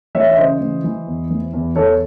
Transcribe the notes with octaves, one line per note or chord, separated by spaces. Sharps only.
E3 C#5 E5
E5
C#3 C5 D#5
E3
E3
E2
E3
E2
E2 A4 C#5